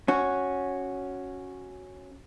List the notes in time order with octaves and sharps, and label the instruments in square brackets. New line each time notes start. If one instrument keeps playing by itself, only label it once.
[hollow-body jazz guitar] C#4 F#4